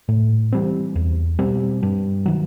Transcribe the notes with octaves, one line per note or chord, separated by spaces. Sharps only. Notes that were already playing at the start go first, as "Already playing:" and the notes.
A2
E3 G3 C4
E2
B2 G3 C4
G2
D#3 F#3